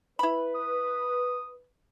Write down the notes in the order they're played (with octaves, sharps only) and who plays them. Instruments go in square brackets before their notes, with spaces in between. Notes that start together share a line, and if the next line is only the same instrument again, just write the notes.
[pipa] E4 B5 [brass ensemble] B4
[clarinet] D#6